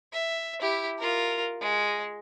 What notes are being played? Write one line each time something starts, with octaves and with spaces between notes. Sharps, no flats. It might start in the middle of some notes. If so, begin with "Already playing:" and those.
E5
E4 G4
F4 A#4
G#3